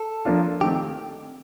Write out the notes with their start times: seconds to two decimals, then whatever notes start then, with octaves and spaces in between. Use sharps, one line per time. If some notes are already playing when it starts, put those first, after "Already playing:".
Already playing: A4
0.25 F3 A#3 D4 F4
0.61 D#3 A3 C4 G4